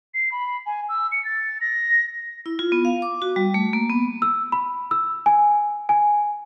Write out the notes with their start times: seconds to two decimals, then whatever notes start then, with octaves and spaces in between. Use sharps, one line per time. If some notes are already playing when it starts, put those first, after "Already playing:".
0.14 C7
0.32 B5
0.66 G#5
0.89 E6
1.12 C#7
1.25 A6
1.61 A#6
2.46 E4
2.59 F4
2.72 B3
2.85 F5
3.02 D6
3.22 F#4
3.36 G3
3.54 A3
3.73 A#3
3.90 B3
4.22 E6
4.52 B5
4.91 E6
5.26 G#5
5.89 G#5